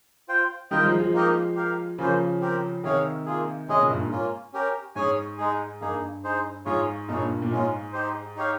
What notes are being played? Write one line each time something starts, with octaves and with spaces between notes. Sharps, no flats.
F4 C5 G5
D#3 G3 F4 A#4 D#5 G5
F3 G#3
F3 G#3
A#3 D#4 G4 A#4 D#5
G4 A#4 F5
C#3 F3 A#3 C#4 F4 C5
C4 G4 A#4
C3 D#3 C#4 G#4 C#5 F5
A#3 F4 G#4
C3 D#3 G#3 C#4 G#4 D#5
A#2 C#3
G2 A#2
G#2
A#3 C#4 F4
C#4 G4 A#4
G#2 C#4 G#4 C#5 G#5
G#3 D#4 G#4
G2 A#3 D#4 G#4
D#4 G#4 C5
G#2 F4 G#4 C#5
G2 A#2 D#4 G#4 C#5
A#2
G#2 G#3 C#4 F4
D#4 G4 C5
D#4 G4 C#5 F5